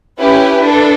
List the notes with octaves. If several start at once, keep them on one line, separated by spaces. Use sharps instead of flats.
C#4 E4 G4 B4
D4 A4